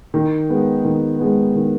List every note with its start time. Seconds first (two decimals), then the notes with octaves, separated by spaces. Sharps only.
0.14 D#3
0.49 G#3 B3
0.85 D#3
1.19 G#3 B3
1.55 D#3